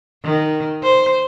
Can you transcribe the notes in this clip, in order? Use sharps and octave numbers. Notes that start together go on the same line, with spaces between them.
D#3
C5